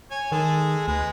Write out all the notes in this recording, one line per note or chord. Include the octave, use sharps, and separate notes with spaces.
C#5 G#5
D#3 G#3 G#4 A4
D2 G#3 B3 G#4